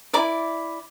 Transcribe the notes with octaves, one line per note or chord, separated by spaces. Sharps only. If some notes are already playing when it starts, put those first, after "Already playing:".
E4 A#4 D5 D6